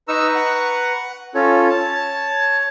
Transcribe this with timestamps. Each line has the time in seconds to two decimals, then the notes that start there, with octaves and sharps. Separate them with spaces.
0.08 D#4 B4 A#5 C#6 E6
0.35 F#5
1.35 C#4 F4 A4 C#5
1.69 A5